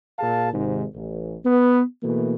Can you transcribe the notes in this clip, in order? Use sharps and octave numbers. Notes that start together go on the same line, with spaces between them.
A#2 G#4 F5 A5
G#1 G#2 C3 D#3
A1
B3
B2 E3 A3 A#3